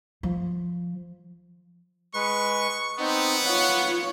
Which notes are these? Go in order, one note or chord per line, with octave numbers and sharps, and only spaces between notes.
F3
G#3 B4 C#6
B3 C4 D#4
F4 C#5 F#5